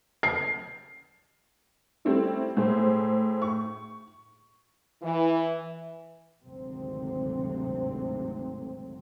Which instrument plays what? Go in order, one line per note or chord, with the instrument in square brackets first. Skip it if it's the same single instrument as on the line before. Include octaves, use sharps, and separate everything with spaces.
[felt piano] C7
[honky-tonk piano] G3 A3 C4 C#4 E4
A2 G#4 C5
C#6
[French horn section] E3
[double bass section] G#1 D2 C3 F#3 C4